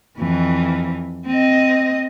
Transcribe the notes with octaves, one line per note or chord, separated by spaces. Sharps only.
F2 E3
C4 D#5